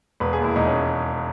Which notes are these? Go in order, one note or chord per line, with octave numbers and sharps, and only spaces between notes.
E1 B4
G#4
D#2
E4
E1 D#4
C#4